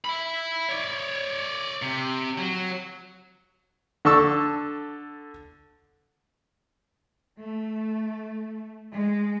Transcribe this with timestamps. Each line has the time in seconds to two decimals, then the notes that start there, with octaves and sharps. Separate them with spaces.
0.05 E5 B5
0.69 C#5 D5
1.82 C3
2.38 F#3
4.05 D3 A4 C#6 E6
7.39 A3
8.92 G#3